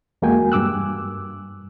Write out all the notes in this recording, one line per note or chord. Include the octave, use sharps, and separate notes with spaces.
E2 G#3 A#3 F#4 G5 G#5
G2 D6 E6 F#6